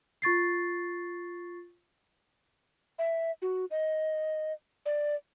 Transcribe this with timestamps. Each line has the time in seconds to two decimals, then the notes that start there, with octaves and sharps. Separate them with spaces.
0.22 F4 C#6 A6 C7
2.99 E5
3.42 F#4
3.71 D#5
4.86 D5